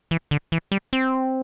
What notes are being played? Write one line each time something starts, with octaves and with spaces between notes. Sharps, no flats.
E3
D3
E3
G3
C4